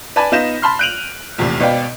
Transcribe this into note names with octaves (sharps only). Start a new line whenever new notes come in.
B4 D5 G#5 A5 B5
B3 D#4 F4 G6 A#6 E7
A5 B5 C6 F6
F#6 G6 D7 D#7 F7 F#7
A#1 E2 A2 C3
G#1 B2 B3 D5 F5 G5